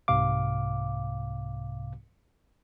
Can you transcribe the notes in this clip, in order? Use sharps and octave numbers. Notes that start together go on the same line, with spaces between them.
C2 G#2 C3 F5 D6